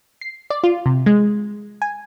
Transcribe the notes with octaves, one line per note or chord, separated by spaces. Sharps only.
C7
D5
F4
C3
G#3
G#5